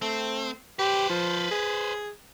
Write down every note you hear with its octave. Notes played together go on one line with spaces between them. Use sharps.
A3 C4
G4 B4 C5
F3
G#4